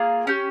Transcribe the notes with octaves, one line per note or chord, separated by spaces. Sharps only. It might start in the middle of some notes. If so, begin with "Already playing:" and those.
Already playing: A#3 F4 G#4
C#4 G4